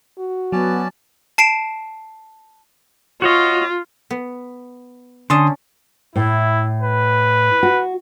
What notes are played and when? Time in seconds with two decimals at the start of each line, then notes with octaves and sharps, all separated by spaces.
0.18 F#4
0.52 F#3 B3 C#4 D5 A5
1.38 A5 C7 D7 E7
3.22 F4 F#4 C#5 D#5
4.11 B3
5.30 D3 C#4 D5 A5 C6 D#6
6.16 A2 E4
6.82 B4
7.63 F#4